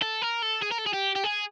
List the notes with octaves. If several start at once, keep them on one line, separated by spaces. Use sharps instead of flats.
A4
A#4
A4
G#4
A#4
A4
G#4
G4
G4
G#4